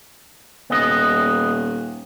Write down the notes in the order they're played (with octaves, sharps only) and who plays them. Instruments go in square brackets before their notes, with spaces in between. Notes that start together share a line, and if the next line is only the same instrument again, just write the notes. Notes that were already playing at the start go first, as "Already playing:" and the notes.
[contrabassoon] D#1 [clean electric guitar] B3 D#5